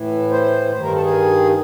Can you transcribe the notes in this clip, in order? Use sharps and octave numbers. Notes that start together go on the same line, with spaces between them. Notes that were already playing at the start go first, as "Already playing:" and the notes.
Already playing: A2 E3
C5
G2 D#3 C5
A#4
A4
G#4